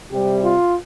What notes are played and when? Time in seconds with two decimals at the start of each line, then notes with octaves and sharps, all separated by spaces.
0.10 C3 G3 G4
0.42 F4